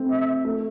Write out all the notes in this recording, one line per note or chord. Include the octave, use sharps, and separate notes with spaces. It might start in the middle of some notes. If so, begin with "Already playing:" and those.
Already playing: A3 C4
E5
A3